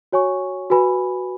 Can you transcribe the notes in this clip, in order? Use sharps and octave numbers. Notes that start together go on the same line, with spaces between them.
F#4 C#5 G#5 C#6
F#4 B4 G#5 B5